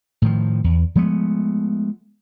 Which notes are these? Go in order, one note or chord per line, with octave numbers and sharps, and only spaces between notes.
A2 D#3 F3
E2
F3 G#3 A3 B3